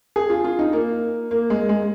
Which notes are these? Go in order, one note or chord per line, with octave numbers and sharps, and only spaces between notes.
G#4
F4
F4
D#4
A#3
A#3
G#3
G#3